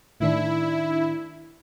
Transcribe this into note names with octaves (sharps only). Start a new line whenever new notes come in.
A2 D#3 D4 E4